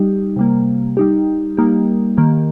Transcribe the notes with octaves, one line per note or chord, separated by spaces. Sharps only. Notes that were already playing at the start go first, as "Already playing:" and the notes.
Already playing: G3 D#4 G4
C3 G3 A#3
G3 D#4 G4
G3 A#3 D#4 G4
D#3 A#3 G4